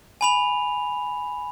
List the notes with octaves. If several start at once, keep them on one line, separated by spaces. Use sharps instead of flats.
G#5 B5 F7